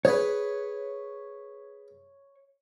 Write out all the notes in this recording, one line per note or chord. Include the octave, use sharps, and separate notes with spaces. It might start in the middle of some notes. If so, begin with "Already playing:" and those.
G#4 B4 C#5